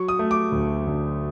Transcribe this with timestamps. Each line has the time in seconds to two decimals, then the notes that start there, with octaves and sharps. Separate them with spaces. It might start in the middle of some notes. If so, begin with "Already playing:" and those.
Already playing: F#3 C#6
0.08 D#6
0.19 A3
0.31 D6
0.52 D2
0.87 D3